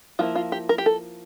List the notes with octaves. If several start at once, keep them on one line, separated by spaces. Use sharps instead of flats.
F3 A#3 E4 F4
F4
G4
A#4
G4
A4